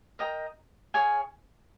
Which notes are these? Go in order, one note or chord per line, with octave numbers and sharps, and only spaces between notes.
A#4 D#5 G5 A#5
G#4 C#5 F5 G#5